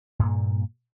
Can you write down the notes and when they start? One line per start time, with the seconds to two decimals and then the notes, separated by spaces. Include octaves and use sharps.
0.19 G2
0.22 A#2
0.25 A#3